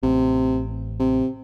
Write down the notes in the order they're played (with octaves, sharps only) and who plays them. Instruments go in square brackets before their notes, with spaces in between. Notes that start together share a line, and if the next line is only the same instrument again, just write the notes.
[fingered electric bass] A1 [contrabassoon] C3
[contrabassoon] C3